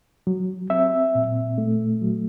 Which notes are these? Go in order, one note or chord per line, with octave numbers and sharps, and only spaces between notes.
F#3
C4 E5
A#2
A3
F#3